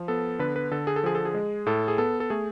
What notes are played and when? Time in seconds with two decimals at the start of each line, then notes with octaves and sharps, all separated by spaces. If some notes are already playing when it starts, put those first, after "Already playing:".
Already playing: F3
0.08 B3 A4
0.39 D3 B4
0.56 B4
0.71 D3 A4
0.87 G#4
0.96 A4
1.03 F3 G#4
1.15 A4
1.25 G#4
1.34 G#3
1.66 A2 A4
1.88 G#4
1.98 B3 A4
2.20 A4
2.30 A3 G#4